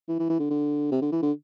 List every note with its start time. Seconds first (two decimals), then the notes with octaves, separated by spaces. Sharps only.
0.09 E3
0.19 E3
0.29 E3
0.40 D3
0.50 D3
0.92 C3
1.02 D3
1.12 E3
1.22 D3